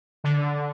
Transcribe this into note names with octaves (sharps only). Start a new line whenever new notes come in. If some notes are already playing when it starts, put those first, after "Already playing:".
D3